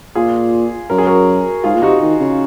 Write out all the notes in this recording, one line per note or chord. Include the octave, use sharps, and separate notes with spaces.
A#2 F4 G#4
F#2 A#4
G#4
F#4 A#4
G#2 F4 G#4
A#2
C3 D#4 F#4
D#3
C#3